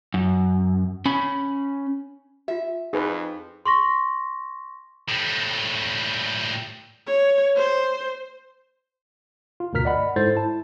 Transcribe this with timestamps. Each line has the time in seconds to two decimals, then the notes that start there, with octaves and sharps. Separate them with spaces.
0.14 F#2
1.06 C#4 B5
2.48 F4 G4 E5
2.93 F2 D#4 G#4 B4
3.65 C6 C#6 A#6
5.08 A2 G3
7.07 C#5
7.56 C5
9.60 F4
9.73 D2 G2 B2 A#4 F6 B6
9.85 D5 D#5 F#5 B5
10.16 G#2 G#3 E4 A4 C5 A6
10.35 E4 A5